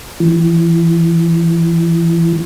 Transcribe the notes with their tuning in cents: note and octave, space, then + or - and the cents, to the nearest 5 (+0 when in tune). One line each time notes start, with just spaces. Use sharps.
E3 +25